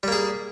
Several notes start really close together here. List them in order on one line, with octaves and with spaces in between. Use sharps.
G3 A#3 G#4